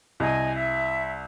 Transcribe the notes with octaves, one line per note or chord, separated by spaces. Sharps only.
C2 D#5 G#5
E5